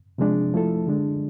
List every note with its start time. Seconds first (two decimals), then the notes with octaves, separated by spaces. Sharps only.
0.18 C3 F3 G#3 D4
0.54 F3 A3 E4 A4
0.87 D3 G#3 D4